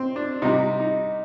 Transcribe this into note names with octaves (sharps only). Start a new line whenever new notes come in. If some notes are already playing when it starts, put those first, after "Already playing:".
Already playing: C4
D4
C3 G3 D#4
D#4